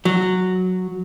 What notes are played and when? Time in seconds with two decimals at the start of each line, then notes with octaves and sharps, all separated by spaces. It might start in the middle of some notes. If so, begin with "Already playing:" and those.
0.05 F#3